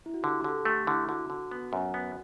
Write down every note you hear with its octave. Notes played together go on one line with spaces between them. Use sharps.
E4
F#4
D3 G4
G4
D3 A4
A3 G4
D3 E4
D3 F#4
D3 F#4
B3
F#2
B3